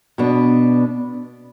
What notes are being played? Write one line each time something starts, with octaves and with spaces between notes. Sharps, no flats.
B2 B3 D4